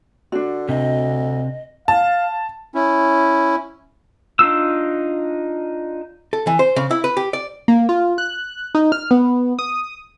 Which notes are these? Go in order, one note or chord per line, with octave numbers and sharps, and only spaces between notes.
D3 D4 F#4
D2 C3 D#5
F5 A5
C#4 E4
D4 D#4 F4 E6
A4
E3
C5
C#3
E4
B4
G4
D5
A#3
F4
F#6
D#4
F6
B3
D#6